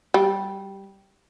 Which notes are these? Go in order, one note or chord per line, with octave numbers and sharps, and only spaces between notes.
G3